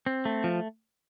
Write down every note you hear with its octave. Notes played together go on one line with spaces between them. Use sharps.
C4
A3
F3